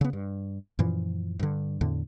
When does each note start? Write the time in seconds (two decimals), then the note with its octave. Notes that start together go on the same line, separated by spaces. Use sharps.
0.01 C#3 B3
0.13 G2
0.79 F#2 A#2 E3 F3
1.39 G2 D3
1.81 E2 A2 D3